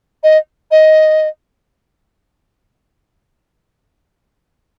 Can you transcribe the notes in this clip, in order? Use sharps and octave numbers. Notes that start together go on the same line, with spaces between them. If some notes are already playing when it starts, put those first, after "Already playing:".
D#5
D#5